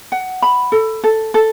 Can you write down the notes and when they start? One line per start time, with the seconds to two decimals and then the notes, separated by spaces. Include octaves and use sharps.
0.12 F#5
0.42 B5
0.72 A4
1.04 A4
1.34 A4